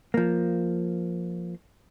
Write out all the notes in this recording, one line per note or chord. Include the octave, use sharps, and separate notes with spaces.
F3 A#3